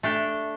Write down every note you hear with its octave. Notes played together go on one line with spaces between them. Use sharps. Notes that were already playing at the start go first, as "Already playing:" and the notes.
A3 D4 G4